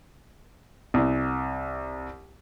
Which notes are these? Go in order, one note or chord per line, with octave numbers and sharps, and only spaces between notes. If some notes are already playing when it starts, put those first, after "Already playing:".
C2